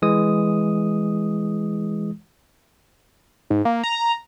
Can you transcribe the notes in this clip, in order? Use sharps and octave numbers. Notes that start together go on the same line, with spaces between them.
E3 G#3 D#6
G#2
A#3
A#5